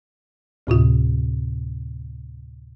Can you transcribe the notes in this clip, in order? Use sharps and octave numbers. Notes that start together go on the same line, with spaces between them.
D2 A2 C3 F4